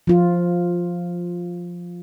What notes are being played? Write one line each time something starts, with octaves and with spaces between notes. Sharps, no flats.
F3 F4